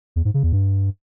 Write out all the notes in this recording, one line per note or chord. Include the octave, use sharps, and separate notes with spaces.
E2
G#2
C#3
E2
G2